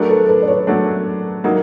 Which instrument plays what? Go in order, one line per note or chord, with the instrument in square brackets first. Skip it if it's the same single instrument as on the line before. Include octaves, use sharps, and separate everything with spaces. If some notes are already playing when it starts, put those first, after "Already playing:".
Already playing: [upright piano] F#3 A3 D4 [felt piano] G#4 A#4
[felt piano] A4 B4
A4 B4
D5
B4 C#5
[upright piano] F#3 A3 D4
F#3 A#3 D#4